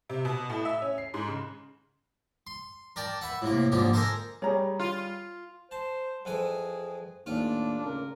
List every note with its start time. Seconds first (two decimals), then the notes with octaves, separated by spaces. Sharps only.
0.09 C3
0.25 B2
0.49 A2
0.65 E5
0.82 C#4
0.98 C7
1.14 G#2
1.28 C#3
2.47 C6
2.96 A#4 D5 G5 A5
3.21 B4 E5 F#5
3.42 A2 C3 A#3
3.72 G#2 D3 F3 A#3 G4
3.93 A4 A#4 C5 D#5 G#5 A#5
4.42 G3 G4 G#4 C#5 A#5
4.80 F4
5.71 C5 A5
6.25 F2 E3 G#4 G#5
7.26 A1 D#2 D4 F4
7.86 C#3 A#4